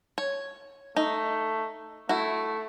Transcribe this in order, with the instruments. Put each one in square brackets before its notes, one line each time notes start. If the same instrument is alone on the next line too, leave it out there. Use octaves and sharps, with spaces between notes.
[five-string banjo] C#5
[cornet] A3 [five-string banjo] D#4
[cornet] A3 [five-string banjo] E4 F#4